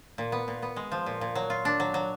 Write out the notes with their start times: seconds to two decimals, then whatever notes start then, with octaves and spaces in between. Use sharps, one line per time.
0.18 A#2
0.32 B3
0.48 A#2
0.62 B3
0.76 G#3
0.92 F3
1.06 A#2
1.21 A#2
1.35 F#3
1.50 F4
1.65 D4
1.80 F#3
1.94 F#3